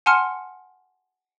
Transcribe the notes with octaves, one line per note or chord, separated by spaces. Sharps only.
F#5 G#5 A5 C6 F6 C#7